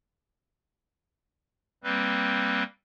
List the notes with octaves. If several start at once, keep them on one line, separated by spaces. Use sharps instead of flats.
G3 A#3 C4 B4